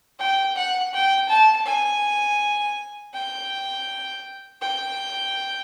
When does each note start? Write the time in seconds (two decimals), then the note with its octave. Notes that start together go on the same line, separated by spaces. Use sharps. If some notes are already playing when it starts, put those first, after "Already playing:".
0.19 G5
0.56 F#5
0.93 G5
1.29 A5
1.66 G#5
3.14 G5
4.62 G5